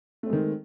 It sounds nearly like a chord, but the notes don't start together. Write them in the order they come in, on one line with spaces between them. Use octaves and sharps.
A3 C4 G#3 D#3